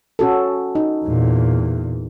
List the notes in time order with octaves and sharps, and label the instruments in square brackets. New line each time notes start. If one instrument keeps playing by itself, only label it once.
[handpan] C#4 F#4 A4
D#4
[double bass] E2 A#2